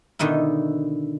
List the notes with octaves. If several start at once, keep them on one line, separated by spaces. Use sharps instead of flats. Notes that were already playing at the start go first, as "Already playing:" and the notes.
B2 D3 D#3 D#4 E4